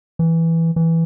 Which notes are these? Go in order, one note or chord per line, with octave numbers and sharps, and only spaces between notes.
E3
E3